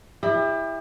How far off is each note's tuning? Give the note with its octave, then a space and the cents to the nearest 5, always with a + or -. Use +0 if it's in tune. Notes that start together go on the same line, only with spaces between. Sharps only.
E4 +0 G4 +35 D#5 -35